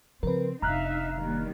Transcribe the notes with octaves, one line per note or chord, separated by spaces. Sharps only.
C#3 F3 C4 A#4 B4
F1 D4 D#4 E5 F5 A#5 F6 F#6
D#3 G3 A#3